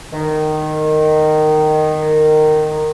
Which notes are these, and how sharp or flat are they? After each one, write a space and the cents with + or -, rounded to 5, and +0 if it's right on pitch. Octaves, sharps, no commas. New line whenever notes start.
D#3 -15